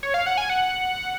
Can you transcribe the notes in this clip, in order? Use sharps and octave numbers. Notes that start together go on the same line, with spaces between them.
C#5
F5
F#5
G#5
F#5